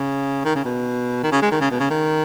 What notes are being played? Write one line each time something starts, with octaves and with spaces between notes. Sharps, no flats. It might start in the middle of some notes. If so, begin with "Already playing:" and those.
Already playing: C#3
D#3
C#3
B2
D#3
C#3
G#3
D#3
C#3
B2
C#3
D#3